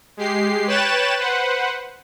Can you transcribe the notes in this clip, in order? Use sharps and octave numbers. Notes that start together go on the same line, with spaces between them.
G#3 G4 C7
B4 C#5 G5 F#6 A6 E7
B4 C5 F#5